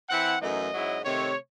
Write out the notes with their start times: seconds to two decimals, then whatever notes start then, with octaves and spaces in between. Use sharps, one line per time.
0.09 E3 C4 E4 F#5
0.41 F#2 E3 A3 D#4 D#5
0.73 G#2 F#3 C#4 E4
1.05 C3 D#3 A3 C#5